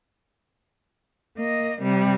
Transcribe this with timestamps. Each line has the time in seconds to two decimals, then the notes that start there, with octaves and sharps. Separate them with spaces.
1.37 A#3 D#5
1.82 C3 G3